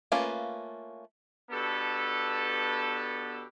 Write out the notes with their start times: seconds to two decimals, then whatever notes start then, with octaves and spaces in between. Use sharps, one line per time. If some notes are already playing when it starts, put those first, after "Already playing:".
0.12 A3 A#3 C#4 F4 B4
1.51 B2 B3 D4 G4 A4